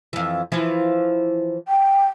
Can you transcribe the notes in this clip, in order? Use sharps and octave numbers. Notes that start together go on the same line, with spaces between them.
F2 E3
E3 F3 E4
G5